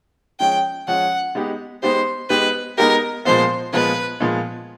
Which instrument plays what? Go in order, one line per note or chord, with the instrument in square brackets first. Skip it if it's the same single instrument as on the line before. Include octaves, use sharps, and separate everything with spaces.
[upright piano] F3 G#3 C#4 [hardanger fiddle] G5
[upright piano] F3 G#3 C#4 [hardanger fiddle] F#5
[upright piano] G#3 B3 D#4 G4
[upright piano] G#3 B3 D#4 G4 [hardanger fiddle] C5
[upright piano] G#3 B3 D#4 G4 [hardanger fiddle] B4
[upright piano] G#3 B3 D#4 G4 [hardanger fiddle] A#4
[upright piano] A#2 F3 G#3 B3 [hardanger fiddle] C5
[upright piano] A#2 F3 G#3 B3 [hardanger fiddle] B4
[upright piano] A#2 F3 G#3 B3